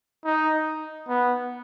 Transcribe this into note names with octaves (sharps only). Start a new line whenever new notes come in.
D#4
B3